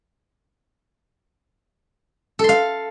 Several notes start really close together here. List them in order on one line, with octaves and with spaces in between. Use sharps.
A4 C6 F5